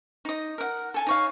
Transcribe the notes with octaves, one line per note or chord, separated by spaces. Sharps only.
D#4 D#5
A#4 F#5
A4 G#5 A5
D#4 C#5 F5